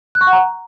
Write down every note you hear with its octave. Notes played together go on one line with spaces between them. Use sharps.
F#6
C#6
F#5
A#5